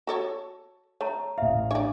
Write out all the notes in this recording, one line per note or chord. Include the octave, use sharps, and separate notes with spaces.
F#4 A4 C#5
A3 C#5 A5 A#5
A1 E5 F5
D4 C#5 D5